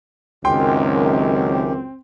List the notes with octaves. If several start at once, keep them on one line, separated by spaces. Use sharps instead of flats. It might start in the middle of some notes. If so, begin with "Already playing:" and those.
C#2 F#2 D#3 G#3 C4 G4 G5 C6